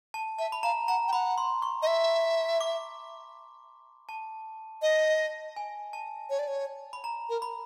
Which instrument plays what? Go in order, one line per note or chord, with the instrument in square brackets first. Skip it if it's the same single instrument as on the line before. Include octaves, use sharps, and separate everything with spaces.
[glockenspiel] A5
[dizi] E5 [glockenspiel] A5
[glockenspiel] B5
[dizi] F5 [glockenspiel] A#5
[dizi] F#5 [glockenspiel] A#5
[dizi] G5
[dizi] F#5 [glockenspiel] B5
[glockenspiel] C6
C#6
[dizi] D#5
E5
[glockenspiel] D6
A5
[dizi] D#5
[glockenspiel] G#5
A5
[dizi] C#5
D5
C#5
[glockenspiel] B5
A#5
[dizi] A#4
[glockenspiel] B5